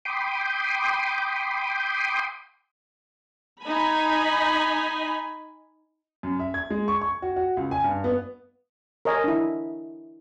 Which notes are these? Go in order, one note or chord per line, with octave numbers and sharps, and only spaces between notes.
G5 B5 C6 D6 D#6
D#4 G#5 B5
F#2
E5
G#6
G#3
C#6
C#6
F#4
F#4
C#2
G#5
G2
B3
A#4 C#5 D#5 G#5
D4 E4